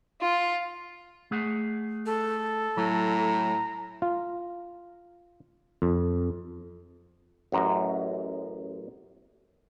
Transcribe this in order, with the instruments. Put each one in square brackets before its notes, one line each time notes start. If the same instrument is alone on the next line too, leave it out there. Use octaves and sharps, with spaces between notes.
[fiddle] F4
[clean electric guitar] A3 G#4 F#5
[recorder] A4
[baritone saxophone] A2 [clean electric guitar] F#3 [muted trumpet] A#5
[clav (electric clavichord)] F4
F2
A1 F#2 A#5